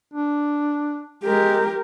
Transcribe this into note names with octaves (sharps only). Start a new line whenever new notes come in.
D4
G#3 G4 A#4